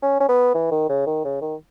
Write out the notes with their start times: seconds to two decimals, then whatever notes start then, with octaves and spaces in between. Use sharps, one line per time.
0.02 C#4
0.20 C#4
0.29 B3
0.55 E3
0.71 D#3
0.89 C#3
1.07 D#3
1.25 C#3
1.41 D#3